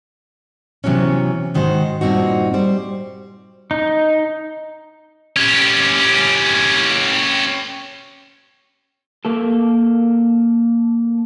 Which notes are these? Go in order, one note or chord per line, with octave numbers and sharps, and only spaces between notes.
C3 E3 F#3 B3 C#4
G#2 D#3 F#4 C5
G2 A#2 C4 D#4 F#4
G3 C5
D#4
C#4 G4
A#3 A4